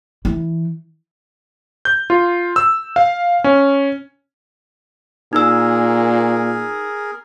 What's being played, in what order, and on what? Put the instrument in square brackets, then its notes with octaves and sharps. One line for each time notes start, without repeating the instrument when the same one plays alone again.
[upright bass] E3
[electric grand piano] G6
F4
E6
F5
C#4
[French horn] A#2 [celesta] D#4 E6 [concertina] G#4 A#4